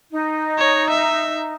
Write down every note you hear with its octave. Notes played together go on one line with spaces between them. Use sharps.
D#4
C#5
E5